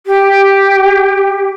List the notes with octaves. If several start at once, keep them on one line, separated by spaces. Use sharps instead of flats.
G4